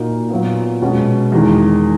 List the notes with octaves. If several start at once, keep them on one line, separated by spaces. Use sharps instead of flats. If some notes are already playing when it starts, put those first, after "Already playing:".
Already playing: A#2 A#3 D#4 F#4
A#2 F#3 B3
B2 G#3 C#4 F#4
E2 D#3 G#3